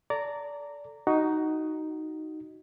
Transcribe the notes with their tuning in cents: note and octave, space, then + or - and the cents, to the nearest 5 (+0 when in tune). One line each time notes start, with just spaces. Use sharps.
A4 +0 D5 -20 A#5 -15
D#4 +0 F#4 +15